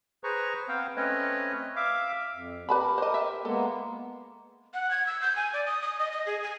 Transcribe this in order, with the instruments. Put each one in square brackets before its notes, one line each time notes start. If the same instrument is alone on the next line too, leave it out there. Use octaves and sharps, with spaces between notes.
[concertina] G#4 B4 C5 A#5 C#6
B3 C4 C5 F5 G5
A3 C4 C#4 B4 C#5 D#5
E5 F5 D6
[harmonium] F2
[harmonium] G4 A#4 [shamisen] B4 A5 B5
[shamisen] C5 D#5
E5
[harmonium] G#3 A#3 B3 [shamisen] A4
[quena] F#5
G#6
E6
G6
G#5
D5
D#6
D#6
D#5
D#5
G#4
G#5